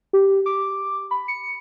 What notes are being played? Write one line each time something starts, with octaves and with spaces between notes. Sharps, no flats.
G4
D6
B5
C#7